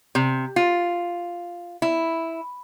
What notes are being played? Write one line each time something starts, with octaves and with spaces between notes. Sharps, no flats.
C3
F4
E4